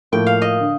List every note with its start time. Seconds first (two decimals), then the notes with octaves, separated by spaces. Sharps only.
0.12 A2 F3 A#3 G5
0.27 F5
0.42 D#5
0.61 D3